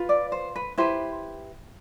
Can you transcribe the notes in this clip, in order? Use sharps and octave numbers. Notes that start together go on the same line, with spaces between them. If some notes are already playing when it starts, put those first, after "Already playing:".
Already playing: F4 B4
D5
C5
B4
E4 G4 B4 C5